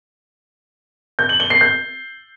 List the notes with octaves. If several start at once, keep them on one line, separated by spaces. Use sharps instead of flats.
G6
F#7
G7
C7
G6